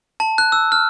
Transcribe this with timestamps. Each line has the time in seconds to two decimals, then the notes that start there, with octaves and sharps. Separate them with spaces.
0.20 A5
0.38 F#6
0.52 E6
0.72 F6